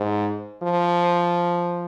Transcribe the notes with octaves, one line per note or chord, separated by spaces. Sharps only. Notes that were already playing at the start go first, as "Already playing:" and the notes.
Already playing: G#2
F3